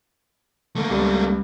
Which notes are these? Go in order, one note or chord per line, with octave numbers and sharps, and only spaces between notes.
A3 A#3
C#2 G3